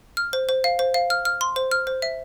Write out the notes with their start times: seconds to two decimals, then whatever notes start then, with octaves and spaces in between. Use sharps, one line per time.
0.17 F6
0.33 C5
0.49 C5
0.64 F5
0.79 C5
0.94 F5
1.10 F6
1.25 F6
1.41 C6
1.56 C5
1.71 F6
1.87 C5
2.02 E5